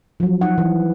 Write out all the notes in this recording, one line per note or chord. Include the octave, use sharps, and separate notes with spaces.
F3 F#3
D#4 F#5
E3